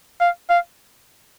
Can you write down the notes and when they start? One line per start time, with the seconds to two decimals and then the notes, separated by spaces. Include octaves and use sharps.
0.21 F5
0.50 F5